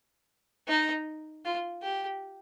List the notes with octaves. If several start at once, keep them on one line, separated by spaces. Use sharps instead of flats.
D#4
F4
G4